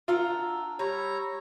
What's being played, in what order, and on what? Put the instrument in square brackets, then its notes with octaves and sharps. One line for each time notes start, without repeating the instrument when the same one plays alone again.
[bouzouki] D4 F#5 A#5 [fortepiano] F4 [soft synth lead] E6
[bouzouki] G3 [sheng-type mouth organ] C#5 A#5